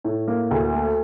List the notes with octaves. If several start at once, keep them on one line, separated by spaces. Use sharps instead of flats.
A2
A#3
D2
A3